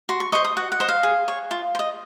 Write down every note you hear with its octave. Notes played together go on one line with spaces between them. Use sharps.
F#4 C6
C#6
C5 D#5 C#6
D#6
F#4 F#5
F#5
C5 D#5
F5
G#4
C#5
F4
C5
D#5